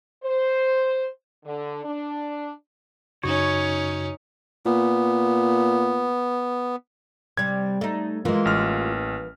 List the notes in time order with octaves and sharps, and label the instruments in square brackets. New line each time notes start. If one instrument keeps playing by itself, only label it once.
[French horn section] C5
D3
D4
[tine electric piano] F#2 C#3 F#4 [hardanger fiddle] C#4 D#4 [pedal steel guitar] C#5
[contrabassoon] A#2 [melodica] B3
[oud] C3 G3 [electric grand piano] G#6
[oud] A3 D#4
[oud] E3 A#3 [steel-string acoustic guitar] G#3 F4
[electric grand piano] A1 F6